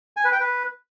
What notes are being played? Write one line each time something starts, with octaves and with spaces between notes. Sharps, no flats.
G#5
B4
G5
B4